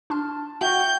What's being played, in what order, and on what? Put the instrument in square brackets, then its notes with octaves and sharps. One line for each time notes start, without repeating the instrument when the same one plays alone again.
[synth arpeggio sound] D4 C6 F6 [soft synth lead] A5
[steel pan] F#4 [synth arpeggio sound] E5 [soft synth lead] G5 [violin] G6